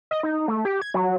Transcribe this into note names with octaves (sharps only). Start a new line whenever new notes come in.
D#5
D#4
A3
G4
G#6
F#3